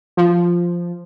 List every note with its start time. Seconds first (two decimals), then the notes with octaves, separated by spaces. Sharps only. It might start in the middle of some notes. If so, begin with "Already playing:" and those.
0.17 F3